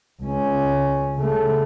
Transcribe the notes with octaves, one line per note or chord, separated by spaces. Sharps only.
C#2 C#4
C#3 A3